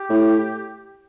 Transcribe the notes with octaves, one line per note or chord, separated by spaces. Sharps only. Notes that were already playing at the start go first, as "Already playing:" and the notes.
Already playing: G4
A2